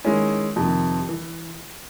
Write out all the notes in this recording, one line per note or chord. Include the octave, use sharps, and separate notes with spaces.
D#3 G#3 C#4 E4
F2 C3 D#3
E3